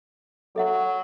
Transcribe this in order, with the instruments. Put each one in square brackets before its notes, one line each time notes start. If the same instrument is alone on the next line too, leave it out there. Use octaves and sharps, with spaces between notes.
[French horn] F#3 [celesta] A4 E5 F#5